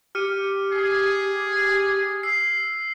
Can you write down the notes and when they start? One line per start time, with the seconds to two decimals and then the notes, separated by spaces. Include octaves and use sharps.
0.15 G4 F6 C#7 D#7
0.72 G#4
2.23 E6 C7